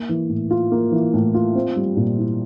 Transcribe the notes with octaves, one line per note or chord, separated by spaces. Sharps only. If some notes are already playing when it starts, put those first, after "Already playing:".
Already playing: A#3
E3
A2
F4
A#3
E3
A2
F4
C4
G3
A#2
E4